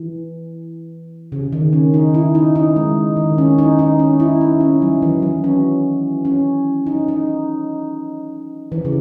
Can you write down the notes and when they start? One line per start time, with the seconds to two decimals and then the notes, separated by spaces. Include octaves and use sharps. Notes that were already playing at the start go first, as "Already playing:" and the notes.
Already playing: E3
1.32 C#3
1.52 D#3
1.73 C#4
1.94 D#4
2.14 E4
2.35 D#4
2.55 D#4
2.76 G#3
3.17 D#3
3.38 C#4
3.58 D#4
3.79 D#4
3.99 C#4
4.20 E4
4.41 D#4
4.60 C#4
4.82 F#3
5.02 E3
5.22 F#3
5.44 C#4
6.25 C#4
6.87 D#4
7.08 D#4
8.72 E3
8.85 C#3